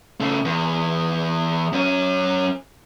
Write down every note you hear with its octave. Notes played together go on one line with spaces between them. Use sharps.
C#3 A3
E2
F#2 C#4